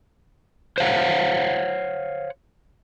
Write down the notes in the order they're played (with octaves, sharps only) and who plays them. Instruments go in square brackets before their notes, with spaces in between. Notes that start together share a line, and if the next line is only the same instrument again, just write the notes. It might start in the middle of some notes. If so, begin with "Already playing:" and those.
[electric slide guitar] C5 C#5 F5 F#5